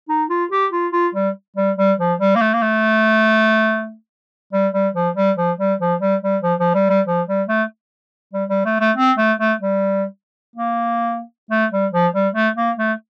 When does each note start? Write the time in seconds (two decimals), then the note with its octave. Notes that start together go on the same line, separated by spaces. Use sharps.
0.09 D#4
0.30 F4
0.51 G4
0.73 F4
0.93 F4
1.15 G3
1.57 G3
1.78 G3
1.99 F3
2.20 G3
2.36 A#3
2.41 A3
2.54 A#3
2.62 A3
4.53 G3
4.74 G3
4.95 F3
5.17 G3
5.37 F3
5.59 G3
5.80 F3
6.01 G3
6.22 G3
6.43 F3
6.59 F3
6.74 G3
6.90 G3
7.07 F3
7.28 G3
7.49 A3
8.33 G3
8.50 G3
8.66 A3
8.81 A3
8.97 C4
9.18 A3
9.39 A3
9.60 G3
10.56 A#3
11.51 A3
11.72 G3
11.92 F3
12.14 G3
12.35 A3
12.56 A#3
12.78 A3